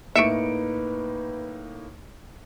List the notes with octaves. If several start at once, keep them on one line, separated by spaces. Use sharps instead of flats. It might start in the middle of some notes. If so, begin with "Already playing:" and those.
A2 A3 A#3 D#4 B4 E5 C#7 D7